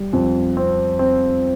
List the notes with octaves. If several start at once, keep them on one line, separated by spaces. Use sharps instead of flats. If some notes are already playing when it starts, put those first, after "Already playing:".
Already playing: G3
F2
C4
C4